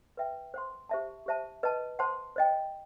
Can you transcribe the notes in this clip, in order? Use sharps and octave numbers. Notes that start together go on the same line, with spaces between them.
B4 E5 G5
C5 F#5 C6
G4 C5 E5 A5
G4 C5 E5 A5
B4 D#5 A5
C5 F#5 A5 C6
C5 D#5 G5